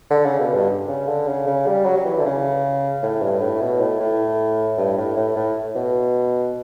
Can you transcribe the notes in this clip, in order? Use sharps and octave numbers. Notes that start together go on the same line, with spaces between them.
D3
C#3
B2
G2
C#3
D3
C#3
C#3
G3
F#3
F#3
E3
D3
C#3
A2
G2
A2
B2
A2
A2
G2
A2
A2
A2
B2